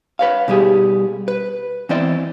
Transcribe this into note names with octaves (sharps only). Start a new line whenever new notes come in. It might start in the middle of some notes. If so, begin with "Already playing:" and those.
B4 C#5 F5
B2 G3 G4 G#4
B4
E3 B3 C4 E4 D5 D#5